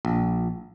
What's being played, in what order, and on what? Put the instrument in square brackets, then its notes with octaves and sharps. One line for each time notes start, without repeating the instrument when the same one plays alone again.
[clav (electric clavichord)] A#1